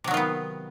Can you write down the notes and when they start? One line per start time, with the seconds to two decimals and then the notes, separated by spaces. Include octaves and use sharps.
0.04 C3
0.07 F#3
0.11 D#3
0.14 F4
0.17 B3